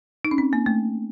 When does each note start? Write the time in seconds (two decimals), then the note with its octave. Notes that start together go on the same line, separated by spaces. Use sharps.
0.25 D#4
0.31 C#4
0.38 C4
0.53 A#3
0.66 A3